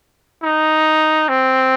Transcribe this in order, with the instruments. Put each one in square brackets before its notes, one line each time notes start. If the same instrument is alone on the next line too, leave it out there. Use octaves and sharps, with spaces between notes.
[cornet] D#4
C4